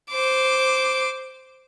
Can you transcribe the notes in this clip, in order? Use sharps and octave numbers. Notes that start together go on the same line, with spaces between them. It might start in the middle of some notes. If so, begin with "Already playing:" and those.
C5 D6